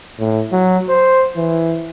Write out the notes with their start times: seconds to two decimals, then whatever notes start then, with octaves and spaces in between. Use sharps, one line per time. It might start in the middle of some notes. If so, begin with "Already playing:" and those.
0.20 A2
0.52 F#3
0.89 C5
1.37 E3